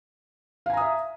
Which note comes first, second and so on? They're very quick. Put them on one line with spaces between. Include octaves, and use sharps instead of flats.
F5 G#5 A#5 D#6 E5